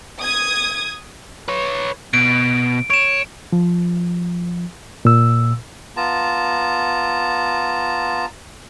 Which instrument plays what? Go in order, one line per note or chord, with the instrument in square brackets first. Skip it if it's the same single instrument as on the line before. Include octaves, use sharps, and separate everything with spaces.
[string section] D#6 G#6
[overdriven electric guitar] B4 C#5
[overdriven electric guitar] B2 [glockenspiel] D7
[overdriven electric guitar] C#5 [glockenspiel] D7 E7
[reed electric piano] F3
A#2 E6
[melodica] B3 F4 A5 A#5